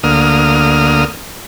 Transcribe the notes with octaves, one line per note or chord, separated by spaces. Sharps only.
D2 A#3 D#6 F6